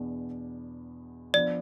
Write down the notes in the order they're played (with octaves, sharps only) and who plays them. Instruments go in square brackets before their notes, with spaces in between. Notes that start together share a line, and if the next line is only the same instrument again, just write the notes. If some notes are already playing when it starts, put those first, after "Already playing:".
Already playing: [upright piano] E2 B2 B3 D4
[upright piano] F3 B3 D4 [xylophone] D5